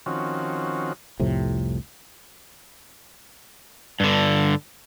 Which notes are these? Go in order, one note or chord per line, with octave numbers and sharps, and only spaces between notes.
D#3 F3 C4 C#4 F#4
C2 F2 A2 C3
G2 D3